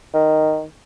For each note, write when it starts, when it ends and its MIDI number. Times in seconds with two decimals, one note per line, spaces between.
0.14 0.64 51